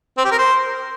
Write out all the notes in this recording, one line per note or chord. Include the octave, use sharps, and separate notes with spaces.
C4
G4
A#4
C5